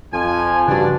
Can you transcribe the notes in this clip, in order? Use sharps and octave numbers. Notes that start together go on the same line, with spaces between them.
F2 F3 G#5
G2 C#3 D4 F#4 D5